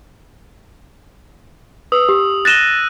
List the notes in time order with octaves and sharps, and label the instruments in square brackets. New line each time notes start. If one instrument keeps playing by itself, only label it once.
[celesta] B4 [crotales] D#6 E6
[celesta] G4
[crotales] F#6 A#6 D#7 [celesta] A6 E7 G7